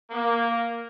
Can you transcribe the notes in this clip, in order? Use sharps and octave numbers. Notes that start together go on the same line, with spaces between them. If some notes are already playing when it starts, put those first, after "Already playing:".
A#3